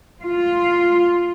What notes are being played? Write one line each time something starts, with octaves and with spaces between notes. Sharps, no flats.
F4